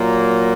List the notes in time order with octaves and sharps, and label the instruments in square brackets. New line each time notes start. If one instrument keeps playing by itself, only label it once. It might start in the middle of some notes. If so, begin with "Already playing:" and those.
Already playing: [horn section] A#2 F#3 A#3